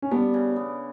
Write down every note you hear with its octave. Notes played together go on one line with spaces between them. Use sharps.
C#4
G3 B3 D4
C#3
B3